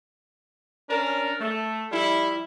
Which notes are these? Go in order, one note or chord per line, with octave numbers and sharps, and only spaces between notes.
C#4 D4 A#4
A3
F3 G3 E4